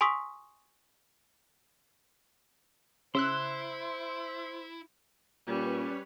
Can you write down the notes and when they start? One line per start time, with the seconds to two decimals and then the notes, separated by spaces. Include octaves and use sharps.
0.01 G#5 C6 C#6 D#6 E6 B6
3.15 C#3 E4 C5 C6 E6 F#6
5.47 A#2 G3 C#4 B4 C#5